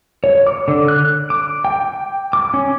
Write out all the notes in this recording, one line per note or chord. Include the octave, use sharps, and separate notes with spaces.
C#5
D6
D3
F#6
D6
G5
D6
C#4